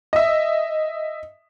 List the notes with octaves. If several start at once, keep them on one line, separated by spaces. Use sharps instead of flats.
D#5 E5